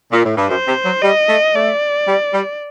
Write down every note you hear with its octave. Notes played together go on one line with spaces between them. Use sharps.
A#2
A2
G2
F#2 C5
C3
F#3
G3 D#5
A3
A3 D5
G3
G3